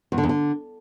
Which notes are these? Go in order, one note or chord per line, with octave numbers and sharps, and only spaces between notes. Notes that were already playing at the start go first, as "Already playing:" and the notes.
E2
D3
E2
D3